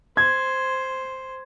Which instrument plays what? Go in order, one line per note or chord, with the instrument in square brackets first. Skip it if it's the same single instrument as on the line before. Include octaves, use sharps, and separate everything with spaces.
[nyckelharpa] C5 [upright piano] G#6